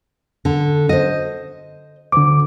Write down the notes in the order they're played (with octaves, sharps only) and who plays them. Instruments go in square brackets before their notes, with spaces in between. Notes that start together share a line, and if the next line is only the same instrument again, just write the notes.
[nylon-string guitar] D3
C5 D#5
[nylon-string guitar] D2 [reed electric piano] D3 D6